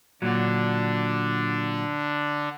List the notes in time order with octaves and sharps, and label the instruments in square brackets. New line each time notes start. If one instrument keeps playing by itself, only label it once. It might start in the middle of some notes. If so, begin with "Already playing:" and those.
[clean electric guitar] A#2 F#3 [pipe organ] D3 D4